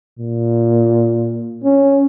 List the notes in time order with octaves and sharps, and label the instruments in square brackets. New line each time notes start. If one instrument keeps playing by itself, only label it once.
[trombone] A#2
C#4